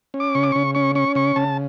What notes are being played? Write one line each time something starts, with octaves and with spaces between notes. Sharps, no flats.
C#4
D6
C#3 C#6
D6
C#3 C#6
C#4 C#6
C#4 C#6
C#3 C#6
C#3 A5